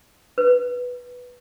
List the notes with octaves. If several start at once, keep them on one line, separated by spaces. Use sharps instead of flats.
B4